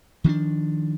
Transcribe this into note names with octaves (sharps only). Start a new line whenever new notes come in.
D#3 F3 C#4 D4